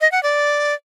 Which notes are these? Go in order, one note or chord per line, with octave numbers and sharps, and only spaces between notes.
D#5
F#5
D5